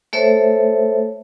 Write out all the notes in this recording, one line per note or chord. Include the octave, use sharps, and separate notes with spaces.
A3 A4 C5 C#5 E5